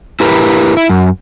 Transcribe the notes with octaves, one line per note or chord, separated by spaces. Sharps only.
E4 G4 A#4 B4
E4
F#2